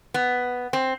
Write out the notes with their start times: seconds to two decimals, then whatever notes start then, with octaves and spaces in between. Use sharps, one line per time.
0.14 B3
0.73 C4